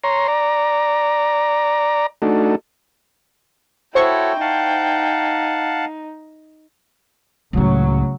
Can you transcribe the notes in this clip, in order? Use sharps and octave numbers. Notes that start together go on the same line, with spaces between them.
C#5 A#5 C6
D5 A#5
A3 D4 D#4 F#4 A4
E4 F#4 A4 C5 C#5 G5 C#6
D#4 F5 F#5 A5
C#2 A2 C#3 F#3